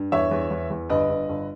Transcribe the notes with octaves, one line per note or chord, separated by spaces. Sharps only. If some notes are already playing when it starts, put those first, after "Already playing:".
Already playing: G2
E2 C#5 E5
E2
E2
E2
G1 B4 D#5
G1
G1